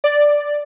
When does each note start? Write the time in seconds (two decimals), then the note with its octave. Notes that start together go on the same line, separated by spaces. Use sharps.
0.04 D5